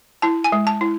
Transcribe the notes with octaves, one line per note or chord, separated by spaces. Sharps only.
E4 A5
G#5
G#3
A5
E4